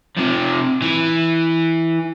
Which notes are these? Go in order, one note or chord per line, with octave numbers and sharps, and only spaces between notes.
C3 F3
E3